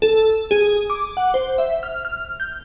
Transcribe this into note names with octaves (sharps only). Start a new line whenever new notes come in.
A4
G#4
D6
F#5
C5
E5
F6
F6
G6